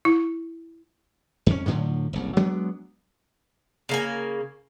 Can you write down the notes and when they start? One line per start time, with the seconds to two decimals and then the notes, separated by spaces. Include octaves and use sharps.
0.05 E4
1.46 F2 C#4
1.66 A2 D3 F3 F#3
2.13 F#1 C2
2.37 F#3 G#3 B3 D4
3.89 C#3 A#3 G#5